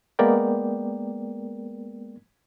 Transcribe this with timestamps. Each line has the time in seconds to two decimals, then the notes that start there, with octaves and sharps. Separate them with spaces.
0.19 G#3 A#3 B3 A#4 D5 G5